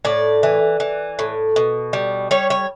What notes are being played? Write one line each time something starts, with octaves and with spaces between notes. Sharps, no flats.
A2 D5
E3
E3
A2
B2
G3
G3 C#5
C#5